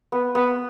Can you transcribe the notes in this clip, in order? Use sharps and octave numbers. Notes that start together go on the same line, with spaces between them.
B3
B3